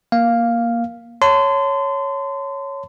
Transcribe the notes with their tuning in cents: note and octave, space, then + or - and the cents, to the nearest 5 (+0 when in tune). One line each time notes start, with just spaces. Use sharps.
A#3 +10 F5 +0
C#5 +0 A5 +20 C6 -30